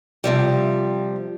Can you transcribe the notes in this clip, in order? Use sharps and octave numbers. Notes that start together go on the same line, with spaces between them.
C3 F3 G3